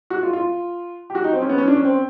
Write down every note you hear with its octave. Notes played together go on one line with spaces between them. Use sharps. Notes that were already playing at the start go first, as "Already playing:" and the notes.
F#4
F4
F4
G4
F#4
D#4
C4
C#4
B3
C#4
D4
C#4
C4